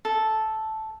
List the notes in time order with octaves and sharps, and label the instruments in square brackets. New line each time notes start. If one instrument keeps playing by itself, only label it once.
[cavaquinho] A4